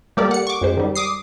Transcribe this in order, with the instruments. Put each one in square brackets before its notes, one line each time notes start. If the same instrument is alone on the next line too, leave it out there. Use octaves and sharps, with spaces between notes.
[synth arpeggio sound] G3 A#3 G4 A4 A#4 D5
F#5 C#7
C#6 D6
F#2 G#3 C5
D#3 G3
D6 D#6 C7